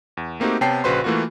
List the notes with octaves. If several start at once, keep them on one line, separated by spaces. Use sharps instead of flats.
E2
A3 A#3 C4 D#4 F#4 G4
C3 B3 C#5 G5 A5 C7
A#1 C#3 F#4 B4 C5 C6
E3 A3 A#3 F4 F#4